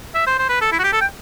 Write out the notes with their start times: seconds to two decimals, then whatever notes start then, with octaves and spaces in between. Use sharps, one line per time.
0.15 E5
0.27 C5
0.39 C5
0.49 B4
0.61 A4
0.72 E4
0.79 F#4
0.84 G4
0.93 A4
1.01 G5